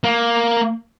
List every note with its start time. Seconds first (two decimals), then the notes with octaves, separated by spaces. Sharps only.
0.04 A#3